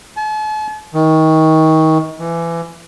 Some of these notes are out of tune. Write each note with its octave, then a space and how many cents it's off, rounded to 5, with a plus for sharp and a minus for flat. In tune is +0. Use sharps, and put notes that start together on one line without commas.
A5 -45
D#3 +30
E3 +25